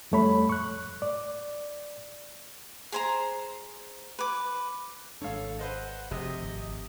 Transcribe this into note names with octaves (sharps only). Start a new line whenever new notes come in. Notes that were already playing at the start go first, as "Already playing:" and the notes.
F2 G3 A3 C#5 B5
C#6 F#6
D5
G#4 C5 A#5
B4 D6
G#1 G#3 D4 A4 C#5 F5
B4 C5 D#5 F#5
F1 C3 D#5
G#1